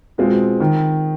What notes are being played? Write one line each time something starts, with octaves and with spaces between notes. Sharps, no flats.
B2 G#3 C4 F4
D#3